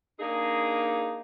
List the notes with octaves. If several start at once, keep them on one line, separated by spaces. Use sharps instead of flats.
A#3 D4 D#4 G#4